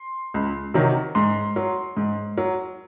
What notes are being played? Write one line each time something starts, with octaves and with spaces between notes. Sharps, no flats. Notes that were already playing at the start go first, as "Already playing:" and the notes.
Already playing: C6
C#2
C3 D#3 F#3
G#2 C6
F#3
G#2
F#3